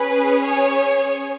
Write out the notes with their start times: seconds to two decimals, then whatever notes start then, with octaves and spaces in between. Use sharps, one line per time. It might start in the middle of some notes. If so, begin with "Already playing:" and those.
Already playing: C#4 G#4 B4
0.42 C#5